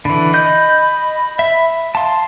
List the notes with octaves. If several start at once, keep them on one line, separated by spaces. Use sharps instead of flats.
D3 E3 B5
D#5 G6
E5
F5 A5 C6